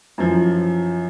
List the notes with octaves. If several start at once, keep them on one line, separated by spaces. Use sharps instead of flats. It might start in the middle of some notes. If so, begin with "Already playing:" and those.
F#2 E3 F3